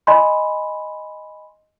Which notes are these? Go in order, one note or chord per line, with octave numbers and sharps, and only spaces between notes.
D#5 G#5 B5 C6